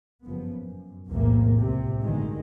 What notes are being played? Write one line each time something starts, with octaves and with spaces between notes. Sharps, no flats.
F#1 G2 F3 B3
F#2
B1 E2 A2 C3 A#3
C#2 A2 C3
A1 G2 B2 D3 D#3 G#3